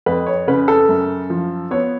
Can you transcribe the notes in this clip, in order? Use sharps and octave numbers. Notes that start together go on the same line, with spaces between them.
F2 B4
C#5
C#3 B4
A4
F#2
F3
B3 C#5